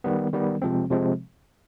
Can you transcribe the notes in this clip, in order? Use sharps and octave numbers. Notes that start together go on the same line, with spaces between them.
D#3 G3 B3
D#3 G3 B3
C3 F3 G#3 C4
C3 F3 G#3 C4